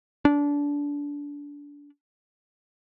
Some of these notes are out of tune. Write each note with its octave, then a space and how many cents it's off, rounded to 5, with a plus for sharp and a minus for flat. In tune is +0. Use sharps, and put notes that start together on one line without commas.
D4 -25